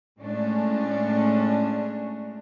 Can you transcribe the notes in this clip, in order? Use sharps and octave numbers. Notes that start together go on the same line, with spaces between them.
A2 G#3 A3 C#4 D4